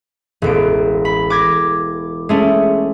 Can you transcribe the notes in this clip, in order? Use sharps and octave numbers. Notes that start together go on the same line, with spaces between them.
E1 A1 D7
B5
D6 G#6 A#6
G#3 A3 C#4